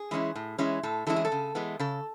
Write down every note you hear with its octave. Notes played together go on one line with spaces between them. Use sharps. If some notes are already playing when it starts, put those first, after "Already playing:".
Already playing: G#4
E3 G#3 C#4 E4
A2
E3 G#3 C#4 E4
A2 A4
E3 G#3 C#4 E4 A4
G#4
A4
C#3
E3 G#3 B3
C#3 A4